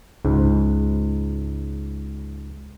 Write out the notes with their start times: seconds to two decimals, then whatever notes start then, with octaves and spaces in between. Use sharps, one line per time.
0.25 C#2 G#2